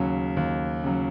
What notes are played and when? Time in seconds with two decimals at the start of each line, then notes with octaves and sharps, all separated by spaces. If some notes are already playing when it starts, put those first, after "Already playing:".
Already playing: D#2 C#3 F#3
0.37 D#2
0.84 C#3 F#3